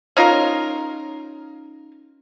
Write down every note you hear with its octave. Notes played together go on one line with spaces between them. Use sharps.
C#4 D#4 F4 A#4